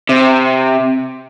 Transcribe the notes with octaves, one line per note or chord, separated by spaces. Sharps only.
C3